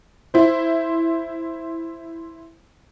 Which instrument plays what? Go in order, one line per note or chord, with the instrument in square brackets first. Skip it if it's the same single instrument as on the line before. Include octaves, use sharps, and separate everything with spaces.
[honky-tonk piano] E4 C5